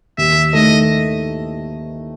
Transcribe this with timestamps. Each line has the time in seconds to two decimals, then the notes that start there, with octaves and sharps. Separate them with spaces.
0.18 D#2 E5
0.53 D#3 A3 D#5